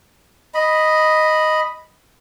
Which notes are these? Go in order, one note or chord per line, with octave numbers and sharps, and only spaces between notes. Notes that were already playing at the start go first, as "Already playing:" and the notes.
D#5 B5